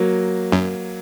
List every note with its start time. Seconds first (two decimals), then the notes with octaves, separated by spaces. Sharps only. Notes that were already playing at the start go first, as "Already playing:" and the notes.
Already playing: F#3 A#3
0.52 F#2